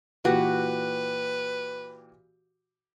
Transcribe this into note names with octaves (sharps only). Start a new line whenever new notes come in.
A#2 E3 F#4 G4 B4